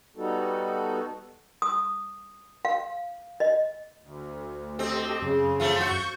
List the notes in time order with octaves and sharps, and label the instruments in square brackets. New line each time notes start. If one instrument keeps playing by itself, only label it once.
[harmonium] G3 B3 D#4 F#4 A4
[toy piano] D#6
F5
D#5
[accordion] D2
[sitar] C4 [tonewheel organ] G4 A4 D#5
[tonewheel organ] F#2 [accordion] C#3
[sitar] F3 A3 F4
[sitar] F#4 [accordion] C#6 G6